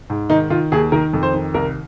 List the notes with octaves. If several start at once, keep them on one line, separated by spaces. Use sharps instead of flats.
G#2
D#3 D#4
D#3 F4
D#2 G#4
D#3 A#4
F2
C5
D#3
C2 A#4